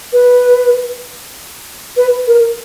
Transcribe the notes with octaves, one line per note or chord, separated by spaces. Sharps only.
B4
B4
A#4